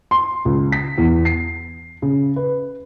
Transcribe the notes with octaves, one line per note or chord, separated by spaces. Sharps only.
C6
C#2
B6
E2
C7
C#3
B4